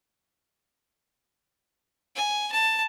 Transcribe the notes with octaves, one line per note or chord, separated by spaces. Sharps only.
G#5
A5